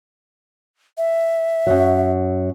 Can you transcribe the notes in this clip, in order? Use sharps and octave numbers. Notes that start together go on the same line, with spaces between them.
E5
F#2 F#3